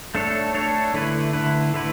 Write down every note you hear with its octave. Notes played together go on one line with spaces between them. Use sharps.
A3 D4 A4 C#5
A3 D4 A4 C#5
D3 A3 E4 B4
D3 A3 E4 B4
D3 A3 E4 B4